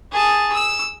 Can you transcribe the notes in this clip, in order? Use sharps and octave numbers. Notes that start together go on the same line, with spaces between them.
G#4 A5
E6